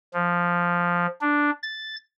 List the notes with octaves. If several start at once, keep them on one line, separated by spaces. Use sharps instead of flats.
F3
D4
A6